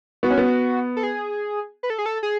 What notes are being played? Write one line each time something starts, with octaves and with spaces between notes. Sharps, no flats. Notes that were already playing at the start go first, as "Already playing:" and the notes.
B3 F#4
C#4
B3
A4
G#4
B4
A4
G#4
A4
G#4